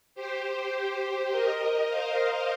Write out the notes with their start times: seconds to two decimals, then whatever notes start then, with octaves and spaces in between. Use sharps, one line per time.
0.15 G4 C5
1.31 A#4 D#5
1.88 C5 F5
2.18 A#4 D#5